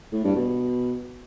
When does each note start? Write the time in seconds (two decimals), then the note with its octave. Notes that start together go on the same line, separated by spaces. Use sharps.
0.13 A2
0.24 G2
0.36 B2